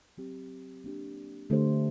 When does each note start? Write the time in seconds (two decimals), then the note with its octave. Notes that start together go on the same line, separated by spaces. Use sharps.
0.18 F#3 C4 G4
0.84 A#3 D4 G4
1.50 D3 A3 D4 G4 C5